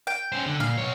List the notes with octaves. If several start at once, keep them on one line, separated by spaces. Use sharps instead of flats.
G5
C#4 C5
D3
A#2 F5
B1 C#5